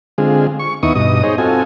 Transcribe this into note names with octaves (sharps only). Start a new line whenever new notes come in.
D3 G#3 C4 F4 G#4
C#6
D#2 B3 D#4 E4 C#6 D#6
G2 B2 D#5 D#6
D#4 G#4 C5 C#5 D#5
C4 F4 F#4 A4 G#5